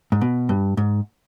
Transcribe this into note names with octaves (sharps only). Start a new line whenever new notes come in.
G#2
B2
G2
G#2